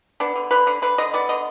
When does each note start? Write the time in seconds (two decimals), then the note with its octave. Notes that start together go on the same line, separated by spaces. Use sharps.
0.20 B3 D4
0.36 D3
0.51 D3 B4
0.67 D3
0.82 D3 B4
0.98 D3 D#5
1.14 B3 D5
1.29 D3 D#5